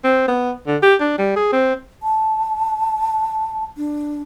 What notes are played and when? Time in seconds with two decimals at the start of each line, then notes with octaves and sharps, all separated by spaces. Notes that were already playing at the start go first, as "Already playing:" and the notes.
0.04 C4
0.28 B3
0.67 D3
0.83 G4
1.00 D4
1.18 G3
1.36 G#4
1.53 C4
2.03 A5
3.77 D4